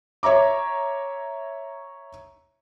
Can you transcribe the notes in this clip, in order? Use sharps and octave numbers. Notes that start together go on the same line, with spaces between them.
C#5 E5 A#5 D6